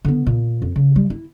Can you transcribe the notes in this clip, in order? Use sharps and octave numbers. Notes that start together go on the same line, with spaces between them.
D3 B3
A#2
F2
C#3
G3
E4